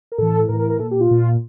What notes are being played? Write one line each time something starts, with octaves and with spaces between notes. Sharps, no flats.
A#4
A2 E3 A4
A2 E3 A#4
A#4
A#4
A#2 A4
G4
F4
A#2